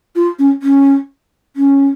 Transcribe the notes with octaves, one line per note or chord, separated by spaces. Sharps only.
F4
C#4
C#4
C#4